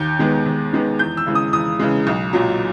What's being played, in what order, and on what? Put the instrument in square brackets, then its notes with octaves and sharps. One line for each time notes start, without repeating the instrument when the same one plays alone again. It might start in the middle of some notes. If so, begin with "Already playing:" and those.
Already playing: [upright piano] D#2 G6
D#3 G#3 B3
D#2
D#3 G#3 B3
E2 G6
E6
C#3 E3 G#3
D#6
E2 D#6
C#3 E3 G#3
B1
A#2 F#3